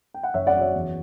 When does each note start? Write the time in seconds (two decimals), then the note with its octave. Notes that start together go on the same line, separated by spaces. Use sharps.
0.14 G5
0.23 F#5
0.34 F#1 C#5 E5
0.47 D5 F#5
0.55 F#3
0.61 C#5 E5
0.74 E2